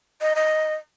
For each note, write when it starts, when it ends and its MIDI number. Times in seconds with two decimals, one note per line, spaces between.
0.21 0.33 75
0.35 0.74 75